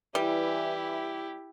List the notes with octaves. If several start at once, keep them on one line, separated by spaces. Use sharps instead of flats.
E3 G3 E4 G4